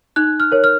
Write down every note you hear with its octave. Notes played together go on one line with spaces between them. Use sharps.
D#4 F#6
F6
A#4 C#5
F6